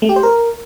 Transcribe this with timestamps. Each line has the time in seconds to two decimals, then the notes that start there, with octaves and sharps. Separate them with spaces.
0.02 A3
0.09 G4
0.16 C5
0.23 A#4